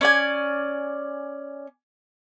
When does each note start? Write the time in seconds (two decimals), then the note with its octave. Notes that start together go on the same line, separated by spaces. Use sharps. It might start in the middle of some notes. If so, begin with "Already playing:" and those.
0.01 C#4 D5 G#5